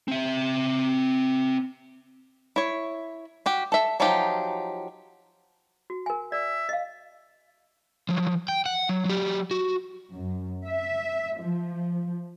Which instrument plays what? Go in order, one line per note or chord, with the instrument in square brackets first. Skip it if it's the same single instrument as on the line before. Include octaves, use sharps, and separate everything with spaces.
[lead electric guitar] C4 E5
[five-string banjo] E4 C#5
F#4 G4
A4 E5
F3 F#3 D#4 F4 G4
[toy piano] F#4
A#4 G#5
[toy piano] D5 [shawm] E5
[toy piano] D#5 F5
[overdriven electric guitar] F3 F#3
G5
F#5
F#3
F#3 G4
F#4
[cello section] F#2
E5
F3